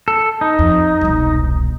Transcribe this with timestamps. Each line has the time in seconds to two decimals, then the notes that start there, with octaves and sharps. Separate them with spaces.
0.08 A4
0.41 D#4
0.59 F2
1.01 E1 C2